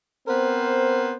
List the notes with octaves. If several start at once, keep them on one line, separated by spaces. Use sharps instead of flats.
B3 C4 A#4 C5